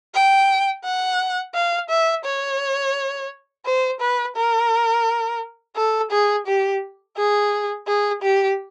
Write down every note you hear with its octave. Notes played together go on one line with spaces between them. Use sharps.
G5
F#5
F5
E5
C#5
C5
B4
A#4
A4
G#4
G4
G#4
G#4
G4